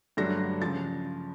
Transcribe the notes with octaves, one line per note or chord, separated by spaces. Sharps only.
G2 D3 F#3 A3 D4 A#6
C#3 F3 A6